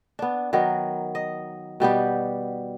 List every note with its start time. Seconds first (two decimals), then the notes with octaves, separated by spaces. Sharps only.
0.19 B3 D4
0.53 D#3 F#3 B3 A#4
1.15 D#5
1.80 B2 G3 B3 G4